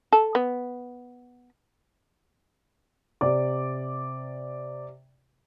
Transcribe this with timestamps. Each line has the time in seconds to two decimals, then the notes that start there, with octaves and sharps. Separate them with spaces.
0.13 A4
0.35 B3
3.21 C3 D5 D6